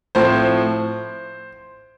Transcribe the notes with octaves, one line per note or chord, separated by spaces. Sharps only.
A2 F3 C4 C5